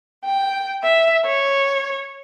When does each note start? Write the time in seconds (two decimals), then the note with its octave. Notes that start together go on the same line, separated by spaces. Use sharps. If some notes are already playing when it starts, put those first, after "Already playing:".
0.25 G5
0.84 E5
1.25 C#5